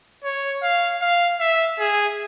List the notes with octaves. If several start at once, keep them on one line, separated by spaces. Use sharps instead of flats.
C#5
F5
F5
E5
G#4